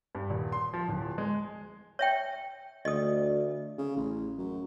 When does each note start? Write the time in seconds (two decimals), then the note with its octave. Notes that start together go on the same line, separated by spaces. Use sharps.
0.15 G2
0.30 D#1
0.52 C6
0.73 F3
0.89 D1
1.18 G#3
1.99 C#5 E5 G5
2.85 D2 D#5 D#6
3.78 C#3
3.96 A1
4.38 F#2